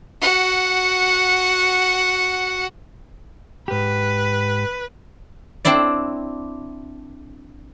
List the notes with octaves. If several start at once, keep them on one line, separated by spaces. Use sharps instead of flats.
F#4 F#5
G#2 G4 B4
C4 D4 E4 D5